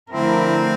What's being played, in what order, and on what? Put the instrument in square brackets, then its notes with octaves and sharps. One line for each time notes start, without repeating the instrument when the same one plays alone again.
[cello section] D3 F3 A3 E4 A#4 [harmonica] C4